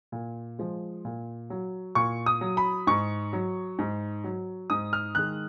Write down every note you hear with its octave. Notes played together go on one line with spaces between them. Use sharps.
A#2
F3 G#3
A#2
F#3
A#2 C#6
D#6
F#3
B5
G#2 C#6
F#3
G#2
F#3
G#2 D#6
F6
D#3 G#3 F#6